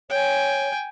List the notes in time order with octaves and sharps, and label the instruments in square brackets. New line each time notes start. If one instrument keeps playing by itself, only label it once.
[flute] C#5 [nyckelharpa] G5 G#5